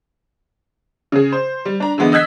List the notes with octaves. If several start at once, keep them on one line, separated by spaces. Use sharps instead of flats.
C#3 G#4
C5
G3
D4 A#5
D3 E3 G#3 B3
D#5 E6 F#6 G#6 B6